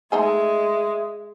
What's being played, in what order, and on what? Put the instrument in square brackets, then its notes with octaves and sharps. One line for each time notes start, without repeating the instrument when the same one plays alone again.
[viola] G#3 [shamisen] A3 D#4 G#4 [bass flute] E5